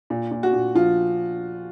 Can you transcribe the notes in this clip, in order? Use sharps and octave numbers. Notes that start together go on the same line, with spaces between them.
A#2
A#2
F#4
A#2
F3 F4